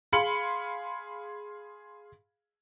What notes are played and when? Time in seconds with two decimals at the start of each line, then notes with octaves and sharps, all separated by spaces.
0.13 G#4 F5 B5 C6 C#7 F#7